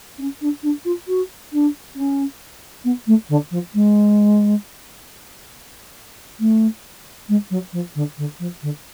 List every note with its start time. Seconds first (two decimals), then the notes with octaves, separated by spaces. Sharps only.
0.18 C#4
0.41 D4
0.63 D4
0.84 F4
1.07 F#4
1.52 D4
1.95 C#4
2.84 B3
3.07 A3
3.29 D3
3.51 F3
3.74 G#3
6.39 A3
7.28 G#3
7.50 F#3
7.72 F3
7.95 D3
8.17 D3
8.39 F3
8.62 D3